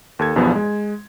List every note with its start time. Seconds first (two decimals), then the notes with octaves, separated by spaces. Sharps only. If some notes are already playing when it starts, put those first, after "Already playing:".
0.19 D#2 A4 G#6
0.36 B1 E2 G2 F3 G3 B3
0.56 G#3